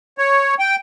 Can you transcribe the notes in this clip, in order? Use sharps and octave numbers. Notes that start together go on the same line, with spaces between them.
C#5
G5